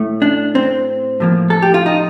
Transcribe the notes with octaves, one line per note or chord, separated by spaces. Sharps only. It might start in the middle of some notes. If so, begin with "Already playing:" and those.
Already playing: A2 A3
D4
C4
A2 F3 A#3
A4
G4
F4
D#4